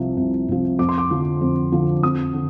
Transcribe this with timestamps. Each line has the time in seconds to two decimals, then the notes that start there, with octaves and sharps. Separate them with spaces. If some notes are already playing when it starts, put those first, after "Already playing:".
Already playing: C2 C3 F3
0.17 C2
0.48 C3 F3
0.79 F2 D6
0.89 C6
0.98 D6
1.10 D3 F3
1.41 F2
1.72 D3 F3
2.03 F2 D#6
2.33 D3